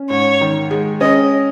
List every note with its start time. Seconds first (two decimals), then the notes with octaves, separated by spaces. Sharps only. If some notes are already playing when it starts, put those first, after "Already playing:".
Already playing: C#4
0.10 G#2 C#5
0.41 D#3
0.71 G#3
1.01 C#4 D#5